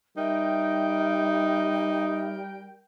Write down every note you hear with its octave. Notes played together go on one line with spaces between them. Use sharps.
G3 D#4 A#4 E5 G5